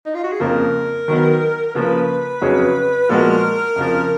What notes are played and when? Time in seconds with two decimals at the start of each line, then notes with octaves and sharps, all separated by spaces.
0.05 D#4
0.14 F4
0.24 F#4
0.32 G#4
0.40 F2 C#3 F3 A#3 A#4
1.08 D#3 F#3 B3
1.75 C#3 F3 A#3 B4
2.41 F2 C#3 F#3 C#4 G#4
3.09 A#2 F3 G#3 B3 F#4 A#4
3.76 F2 C#3 F3